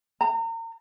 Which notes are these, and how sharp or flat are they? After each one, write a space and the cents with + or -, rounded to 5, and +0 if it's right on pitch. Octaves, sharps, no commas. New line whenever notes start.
A#5 -35